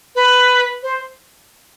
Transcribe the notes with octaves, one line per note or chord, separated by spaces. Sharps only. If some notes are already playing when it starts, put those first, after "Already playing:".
B4
C5